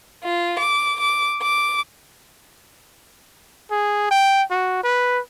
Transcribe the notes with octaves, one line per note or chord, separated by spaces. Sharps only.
F4
D6
D6
D6
G#4
G5
F#4
B4